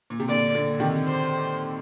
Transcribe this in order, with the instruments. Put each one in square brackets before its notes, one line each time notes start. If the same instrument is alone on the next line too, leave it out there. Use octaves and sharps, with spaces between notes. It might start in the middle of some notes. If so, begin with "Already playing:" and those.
[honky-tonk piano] A#2
C3
[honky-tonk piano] A#2 D3 [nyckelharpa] D5
[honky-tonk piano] A#2 D3
C3 D#3
[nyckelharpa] C5